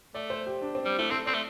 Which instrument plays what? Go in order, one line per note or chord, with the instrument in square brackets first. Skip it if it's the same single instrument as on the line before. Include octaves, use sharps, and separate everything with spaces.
[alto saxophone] A3 [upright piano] D5
[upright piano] C5
G4
D4
C4
[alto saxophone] G3
[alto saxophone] A3 [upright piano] E4
[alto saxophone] C4 [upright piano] A4
[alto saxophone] C4 [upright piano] D5
[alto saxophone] A3